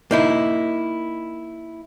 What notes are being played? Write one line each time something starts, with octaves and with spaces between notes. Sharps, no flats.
A#3 D#4 E4